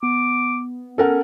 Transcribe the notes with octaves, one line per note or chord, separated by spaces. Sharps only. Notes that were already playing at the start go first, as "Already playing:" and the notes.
B3 D6
C#4 A4 A#4 F#5